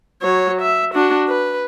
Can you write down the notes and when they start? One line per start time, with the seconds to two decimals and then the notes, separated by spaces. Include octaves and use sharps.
0.22 F#3 C#5
0.61 E5
0.94 D4 F#4
1.28 B4